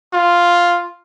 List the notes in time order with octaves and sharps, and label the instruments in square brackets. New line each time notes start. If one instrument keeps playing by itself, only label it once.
[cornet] F4